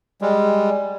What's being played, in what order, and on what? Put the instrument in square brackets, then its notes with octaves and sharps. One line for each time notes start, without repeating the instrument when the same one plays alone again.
[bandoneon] G3 G#3